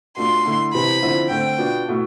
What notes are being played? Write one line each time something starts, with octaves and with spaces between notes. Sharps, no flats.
B2 A3 D4 F4 C6
D3 A3 E4
C3 E3 B3 E4 B5
D3 F3 C4 E4
D3 A3 C4 G5
B2 B3 D4 F4
B2 A3 E4